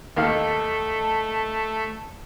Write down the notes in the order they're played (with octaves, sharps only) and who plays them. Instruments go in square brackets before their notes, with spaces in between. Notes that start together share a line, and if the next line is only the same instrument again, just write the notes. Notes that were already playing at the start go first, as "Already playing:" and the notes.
[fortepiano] D#2 D#3 F5 [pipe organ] A3 A4 [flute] A5